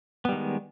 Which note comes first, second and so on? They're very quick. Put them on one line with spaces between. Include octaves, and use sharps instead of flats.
B3 G3 D#3 G#3